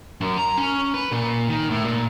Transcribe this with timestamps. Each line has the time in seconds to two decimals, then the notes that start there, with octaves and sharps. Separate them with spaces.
0.21 F#2
0.38 A#5
0.57 C#4
0.94 B4
1.11 A#2
1.49 D#3
1.70 A2
1.84 A#2